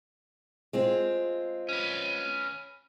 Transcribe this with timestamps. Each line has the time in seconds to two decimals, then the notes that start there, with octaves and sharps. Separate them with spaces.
0.73 G#3 C4 F4
1.69 C#4 B4